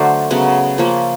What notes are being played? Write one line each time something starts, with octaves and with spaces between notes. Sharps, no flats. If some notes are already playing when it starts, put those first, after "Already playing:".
Already playing: D3 F#3 A3 C5 D5
C#3 F#3 B3
F3 A#3 C#4